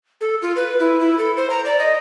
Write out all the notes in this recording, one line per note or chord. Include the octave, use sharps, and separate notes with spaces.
A4
F4
B4
E4
E4
A4
C5
A#5
D5
D#5